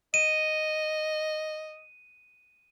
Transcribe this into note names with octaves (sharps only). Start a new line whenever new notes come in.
D#5 D#7